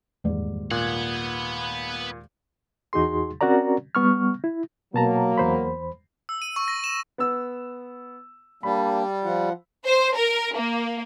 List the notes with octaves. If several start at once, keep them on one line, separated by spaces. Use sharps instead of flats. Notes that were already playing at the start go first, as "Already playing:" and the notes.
D#1 E2 G#2 D5
A#2 B4 F#5 G#6
E2 D#4 F#4 G#4 C6
C4 C#4 F#4 A#4 D5 A#5
G3 B3 C#6 F6
E4
B2 F#3 A#3 A5 A#5
E2 C5 B5
E6
D#7
C#6
A#6
E7
B3 E6
G3 A#3 D4 B5
F3 F4 F#5
C5
A#4
A#3